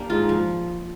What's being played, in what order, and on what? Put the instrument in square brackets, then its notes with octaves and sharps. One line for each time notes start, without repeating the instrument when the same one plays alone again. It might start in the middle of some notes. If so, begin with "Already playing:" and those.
Already playing: [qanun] A#3 D4 G4
[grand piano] G#2 G#3 [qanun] F4
[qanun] F3